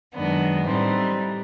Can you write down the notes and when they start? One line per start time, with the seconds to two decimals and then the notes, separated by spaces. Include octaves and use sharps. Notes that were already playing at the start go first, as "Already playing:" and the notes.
0.14 F#2 D#3 G#3 B3 D4
0.66 A2 E3 G3 C4 D#4